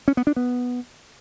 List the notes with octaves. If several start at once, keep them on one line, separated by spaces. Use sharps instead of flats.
C#4
B3
D4
B3